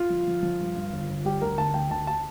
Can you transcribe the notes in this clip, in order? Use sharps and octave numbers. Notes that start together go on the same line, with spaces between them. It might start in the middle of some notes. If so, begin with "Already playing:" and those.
Already playing: F4
F3
F3
F3
G2
G2
G1
G1
G3 G4
D2 A#4
D2 A5
D2 G5
D2 A5
A5